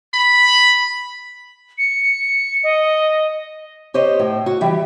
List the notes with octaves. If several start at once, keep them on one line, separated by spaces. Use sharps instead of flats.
B5
C#7
D#5
G4 C5 C#5 D#5
A2
F#4
E3 G3 G4